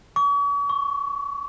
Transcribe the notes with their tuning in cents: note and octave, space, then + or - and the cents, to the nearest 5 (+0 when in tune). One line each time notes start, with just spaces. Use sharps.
C#6 +45
C#6 -5